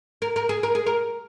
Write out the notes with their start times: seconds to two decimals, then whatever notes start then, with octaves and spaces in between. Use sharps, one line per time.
0.22 A#4
0.36 A#4
0.49 G#4
0.63 A#4
0.75 G#4
0.86 A#4